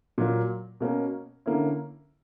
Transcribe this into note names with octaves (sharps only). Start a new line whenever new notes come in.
A#2 F#3 A#3
B2 A#3 C#4
D3 A#3 C#4 E4